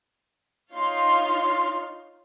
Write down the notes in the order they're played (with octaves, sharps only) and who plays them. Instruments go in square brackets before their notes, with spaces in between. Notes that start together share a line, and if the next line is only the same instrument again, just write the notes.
[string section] D#4 F4 C#5 F5 C6